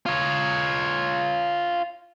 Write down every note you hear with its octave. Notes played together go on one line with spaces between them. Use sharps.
F4 C#5